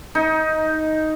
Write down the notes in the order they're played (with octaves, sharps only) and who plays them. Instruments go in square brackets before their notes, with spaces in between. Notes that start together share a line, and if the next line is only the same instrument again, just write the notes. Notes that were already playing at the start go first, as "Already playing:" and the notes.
[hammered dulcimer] D#4